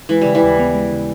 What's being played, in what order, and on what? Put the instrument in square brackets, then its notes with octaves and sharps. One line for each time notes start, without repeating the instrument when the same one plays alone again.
[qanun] E3 [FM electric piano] G#3
[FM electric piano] C#3 [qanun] G3
[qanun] E3
[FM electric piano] D#2
B3
G#3
C#3